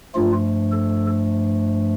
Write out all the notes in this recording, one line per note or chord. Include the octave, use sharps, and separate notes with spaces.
G2 F3 A3 F4
A4